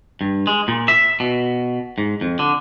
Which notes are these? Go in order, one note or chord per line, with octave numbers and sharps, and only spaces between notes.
G2
G#3
A#2
E5
B2
G#2
F2
D3